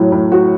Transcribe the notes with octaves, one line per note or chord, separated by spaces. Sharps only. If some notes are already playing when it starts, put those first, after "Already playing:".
Already playing: A2 F#3
A2
F#4